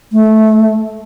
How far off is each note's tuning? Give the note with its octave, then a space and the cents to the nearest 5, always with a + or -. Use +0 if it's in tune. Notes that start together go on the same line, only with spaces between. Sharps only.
A3 -15